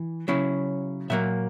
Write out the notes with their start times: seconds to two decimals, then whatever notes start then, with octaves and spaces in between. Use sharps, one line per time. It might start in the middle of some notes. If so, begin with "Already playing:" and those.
Already playing: E3
0.28 C#3 F#3 C#4 E4
1.10 A#2 F#3 A#3 E5